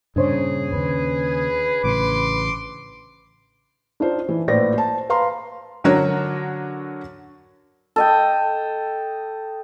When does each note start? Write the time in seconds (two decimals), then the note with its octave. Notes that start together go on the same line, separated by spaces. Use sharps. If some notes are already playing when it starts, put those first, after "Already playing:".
0.16 G2 A#2 C#3 D4 G#4 C5 C#5
0.72 D#2 C#3 B4
1.84 A1 A2 C#3 C6 D6
4.00 D4 D#4 F4 C5
4.29 E3
4.48 A#1 A2 B4 C5 D5 A#6
4.74 C5 A5
5.09 B4 F5 A#5 C6
5.84 D3 F#3 F#4 A#4 C#5
7.96 A4 D#5 G5